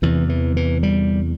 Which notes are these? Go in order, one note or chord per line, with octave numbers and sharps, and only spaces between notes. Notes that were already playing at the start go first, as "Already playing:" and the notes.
E2 C3 E3
E3
E3
G3